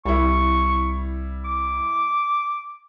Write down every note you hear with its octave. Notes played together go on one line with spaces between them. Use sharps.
C2 G3 E4 C#6
D6